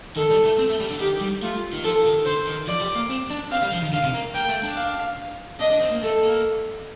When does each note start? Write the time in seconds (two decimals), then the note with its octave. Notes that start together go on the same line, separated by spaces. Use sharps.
0.16 D#3 A4
0.31 G3
0.45 A3
0.59 C4
0.70 A3
0.80 G3
0.90 D3
1.00 D#3 G4
1.21 G3
1.43 A3 F4
1.73 D#3
1.84 F3 A4
2.05 D#3
2.25 D3 C5
2.47 D#3
2.67 F3 D5
2.81 G3
2.96 A#3
3.10 C4
3.30 D4
3.51 C4 F5
3.62 G3
3.72 F3
3.82 D#3
3.93 D3 F5
4.03 C3
4.14 A#3
4.34 A#3 G5
4.49 A3
4.63 D4
4.77 F5
5.60 D4 D#5
5.71 D4
5.80 C4
5.91 A#3
6.02 A3 A4
6.23 A#3